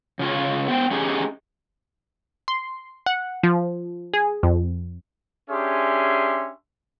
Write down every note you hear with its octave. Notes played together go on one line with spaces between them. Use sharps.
C#3 F4 C#5
B3 C5 G5
A3 C#4 D#4 G4 G#4
C6
F#5
F3
G#4
F2
C#4 D4 G4 G#4 E5 C6